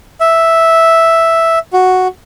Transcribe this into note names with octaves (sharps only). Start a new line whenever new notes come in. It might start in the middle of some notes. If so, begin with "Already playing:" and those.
E5
F#4